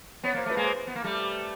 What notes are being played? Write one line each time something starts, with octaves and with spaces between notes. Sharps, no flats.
B3 C#5
A#3 C5
A3 B4
G#3 A#3
C5
B3
A#3
G3 A3